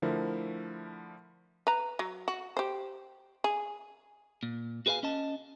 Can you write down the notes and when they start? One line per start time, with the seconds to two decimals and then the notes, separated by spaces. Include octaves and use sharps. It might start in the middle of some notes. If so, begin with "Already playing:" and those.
0.02 D3 F3 A3 E4 A#4
1.67 B4 A#5
1.99 F#3
2.28 F#4
2.57 G4 C5
3.44 G#4
4.43 A#2
4.86 F#4 G#4 B4 D#5 F5 G#5
5.03 C#4 D#5 A5